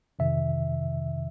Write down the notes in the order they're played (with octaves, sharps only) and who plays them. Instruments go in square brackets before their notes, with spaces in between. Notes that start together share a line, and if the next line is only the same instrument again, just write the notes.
[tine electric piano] F2 C3 D#3 E5